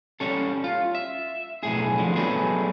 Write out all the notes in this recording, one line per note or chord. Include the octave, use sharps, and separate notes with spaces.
G3 C#4 A4
F4
E5
B1 A2 G#4
D3 F3
F#3 G3 A3 B3 G#4